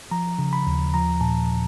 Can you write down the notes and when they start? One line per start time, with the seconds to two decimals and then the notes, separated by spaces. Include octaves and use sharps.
0.11 F3 A#5
0.39 C#3
0.53 B5
0.67 D#2
0.94 F3 A#5
1.21 A#2 A5